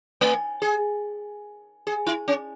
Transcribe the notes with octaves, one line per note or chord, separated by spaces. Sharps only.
A3
G#4
G#4
E4
C#4